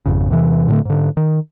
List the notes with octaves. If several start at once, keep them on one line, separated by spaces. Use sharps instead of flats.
G#1 F2 C#3
E2 C3 E3
A2 D3 A3
G#2 D3
D#3